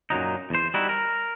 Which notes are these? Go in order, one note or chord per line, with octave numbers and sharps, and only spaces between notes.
F#2 A#2 F#3 D#4
E2 C5
G3 D#4 E4 F#4
A#4